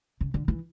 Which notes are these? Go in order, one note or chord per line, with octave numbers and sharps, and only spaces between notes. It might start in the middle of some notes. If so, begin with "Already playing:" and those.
C#3
D3
E3